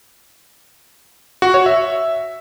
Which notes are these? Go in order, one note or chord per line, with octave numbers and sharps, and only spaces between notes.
F#4
C#5
E5